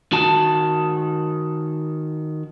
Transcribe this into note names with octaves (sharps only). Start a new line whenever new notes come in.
D#3 F#4 A5